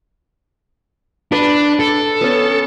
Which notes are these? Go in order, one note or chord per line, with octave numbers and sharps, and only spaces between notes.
D4 B4 B5
A4
B3 C#4